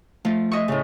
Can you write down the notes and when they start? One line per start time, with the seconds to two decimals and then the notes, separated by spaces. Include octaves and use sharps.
0.25 F3 A3 F4
0.52 D#5 E5 C#6
0.68 A2 C#3